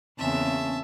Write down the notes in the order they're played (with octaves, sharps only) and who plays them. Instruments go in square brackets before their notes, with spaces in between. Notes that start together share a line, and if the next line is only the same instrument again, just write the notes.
[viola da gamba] E2 C#3 A#3 [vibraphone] C4 C#4 G#5 [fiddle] E5 A5